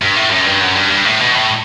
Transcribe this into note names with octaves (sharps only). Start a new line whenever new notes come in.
G2
A2
F#2
G2
F#2
G2
G2
A2
B2
A2